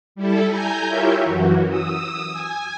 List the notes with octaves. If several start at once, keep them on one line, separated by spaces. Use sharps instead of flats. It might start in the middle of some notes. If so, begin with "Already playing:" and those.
G3 E4 A4
G#5 A#5 G6
E4 F4 G4 A#4 C#5 E5
F#2 E3 F#4
D#6 E6
G#5